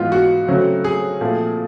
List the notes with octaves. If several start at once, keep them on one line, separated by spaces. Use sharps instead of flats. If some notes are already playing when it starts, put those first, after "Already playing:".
Already playing: G#2 E3 G#3 B3 F4
F#4
C#3 F#3 A3 C4
G#4
A#2 F3 A3 C4